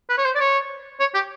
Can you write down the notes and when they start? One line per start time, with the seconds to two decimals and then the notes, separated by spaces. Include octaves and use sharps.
0.09 B4
0.18 C#5
0.25 C5
0.35 D5
0.40 C#5
1.00 C#5
1.14 G4